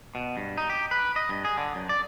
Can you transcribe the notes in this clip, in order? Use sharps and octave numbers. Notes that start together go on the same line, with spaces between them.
B2
G2
D#4
G4
B4
D#5
G2
G#4
D3
F#2
D5